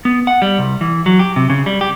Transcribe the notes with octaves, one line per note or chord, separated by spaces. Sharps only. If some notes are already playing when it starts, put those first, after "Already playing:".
B3
F#5
G3
C2
E3
F#3
G4
C3
C#3
G3
G4